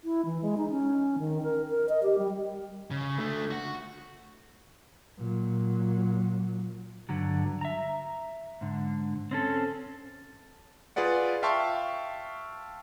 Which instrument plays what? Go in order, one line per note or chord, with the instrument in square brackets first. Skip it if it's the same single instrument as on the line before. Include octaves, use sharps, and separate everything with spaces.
[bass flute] E4
E3
G#3
D#4
C#4
D#3
A#4
A#4
D#5
G4
G3
[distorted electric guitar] C#3
D3 A3
F#4 F#5
[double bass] A#2 F#3
[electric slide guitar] G2 D3 F#3
E5 A#5
G#2 D3
C4 C#4 A4
[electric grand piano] F4 G#4 B4 D5 F#5
E5 F5 G5 A5 C6 C#6